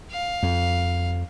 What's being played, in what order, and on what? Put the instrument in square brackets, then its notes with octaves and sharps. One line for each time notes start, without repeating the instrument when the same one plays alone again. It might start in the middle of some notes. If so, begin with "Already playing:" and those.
[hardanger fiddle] F5
[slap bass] F2